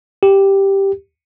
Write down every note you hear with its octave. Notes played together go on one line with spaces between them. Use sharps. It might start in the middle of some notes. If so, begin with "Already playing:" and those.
G4